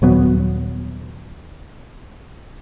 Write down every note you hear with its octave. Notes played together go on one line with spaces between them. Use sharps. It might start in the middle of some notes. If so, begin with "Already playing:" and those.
D#1 F#3 B3